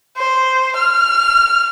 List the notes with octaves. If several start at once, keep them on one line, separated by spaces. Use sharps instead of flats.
C5
F6